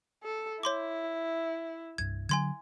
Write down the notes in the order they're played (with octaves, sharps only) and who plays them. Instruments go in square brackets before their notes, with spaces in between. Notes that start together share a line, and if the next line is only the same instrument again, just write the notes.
[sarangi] A4
[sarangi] E4 [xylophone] C#5 C6 D6
[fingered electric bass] C2 G2 [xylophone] G#6
[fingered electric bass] D3 F#3 [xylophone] G#5 C6 G#6